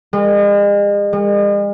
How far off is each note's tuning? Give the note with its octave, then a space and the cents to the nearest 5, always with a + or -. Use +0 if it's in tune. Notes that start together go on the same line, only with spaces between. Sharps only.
G#3 -40
G#3 -45